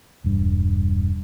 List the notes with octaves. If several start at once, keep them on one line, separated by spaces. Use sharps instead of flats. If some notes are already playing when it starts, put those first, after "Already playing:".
E1 G2